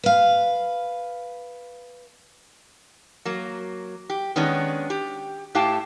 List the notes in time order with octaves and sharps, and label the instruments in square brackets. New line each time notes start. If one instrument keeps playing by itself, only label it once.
[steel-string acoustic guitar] B4 F5
[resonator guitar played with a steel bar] F#3 A#3
G4
D#3 G#3 B3 C#4 D4
G4
A2 G4 F5 G5 A5